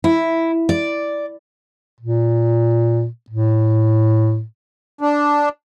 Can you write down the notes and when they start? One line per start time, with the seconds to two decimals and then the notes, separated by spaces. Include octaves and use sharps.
0.04 E4
0.69 D5
2.00 A#2
3.30 A2
5.01 D4